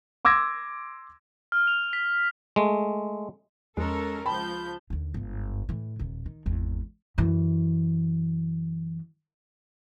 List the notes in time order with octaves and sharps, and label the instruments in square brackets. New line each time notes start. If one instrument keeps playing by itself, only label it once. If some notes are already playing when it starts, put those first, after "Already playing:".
[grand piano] C6 D6 E6 G#6 A#6
[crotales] F6
F7
B6
[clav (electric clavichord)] G#3 A3
[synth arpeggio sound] E2 F3 G#5 [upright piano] G#3 [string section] C#4 A4 A#4
[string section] C#2 F3 G6 [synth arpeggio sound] G5 C6 [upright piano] A5 B5
[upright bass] D#2 D3
G1 G#2
A2 E3
D#1 D#3
D#3
G#1 E2
F#2 E3